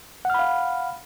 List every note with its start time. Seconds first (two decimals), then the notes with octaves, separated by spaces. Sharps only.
0.25 F#5
0.30 F6
0.34 B5
0.39 F5